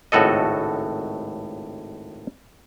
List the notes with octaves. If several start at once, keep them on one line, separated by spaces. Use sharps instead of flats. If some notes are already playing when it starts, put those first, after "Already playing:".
G#1 C#2 A2 F#4 A4 D#5